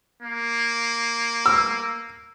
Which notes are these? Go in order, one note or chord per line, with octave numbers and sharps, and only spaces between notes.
A#3
E6